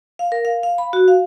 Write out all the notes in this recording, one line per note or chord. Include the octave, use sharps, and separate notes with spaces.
F5
A#4
F5
F5
B5
F#4
F5